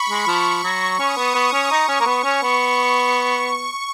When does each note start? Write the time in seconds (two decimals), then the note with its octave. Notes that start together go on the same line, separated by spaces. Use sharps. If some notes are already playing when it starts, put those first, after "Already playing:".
Already playing: B5 C#6
0.09 G#3
0.27 F3 C#6
0.63 F#3
0.98 C#4 D#6
1.17 B3
1.35 B3
1.52 C#4
1.70 D#4 C#6
1.88 C#4
2.00 A#3
2.06 B3
2.24 C#4
2.42 B3 C#6
3.13 C#6